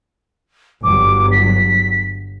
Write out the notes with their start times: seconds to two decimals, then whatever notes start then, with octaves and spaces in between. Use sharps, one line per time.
0.83 G1 G2 F#3 D6
1.32 B6